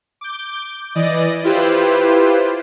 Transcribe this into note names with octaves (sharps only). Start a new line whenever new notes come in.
D6 G6
E3 D5 D#5
E4 F4 G4 B4 C5